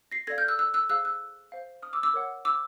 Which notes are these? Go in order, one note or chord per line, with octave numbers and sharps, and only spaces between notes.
A#6 C7
A4 D5 F5 G#6 A#6
F6 G6
E6 F#6
E6 F#6
E6 F#6
G#4 C5 F5 E6 F#6
E6 F#6
C5 F5
D#6 F6
D6 E6
D6 E6
A#4 C#5 F#5
D6 E6